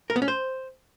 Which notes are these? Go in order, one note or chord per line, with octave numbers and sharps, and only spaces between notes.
A#4
B3
C#4
C5